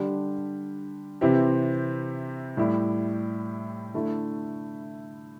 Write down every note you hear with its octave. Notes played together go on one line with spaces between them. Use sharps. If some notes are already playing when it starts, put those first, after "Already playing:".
Already playing: D3 G3 D4 G4
C3 E3 C4 E4 G4
A2 G3 E4 G4
D3 A3 E4